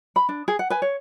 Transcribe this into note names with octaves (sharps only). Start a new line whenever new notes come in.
B5
D4
G#4
F#5
B4 G#5
C#5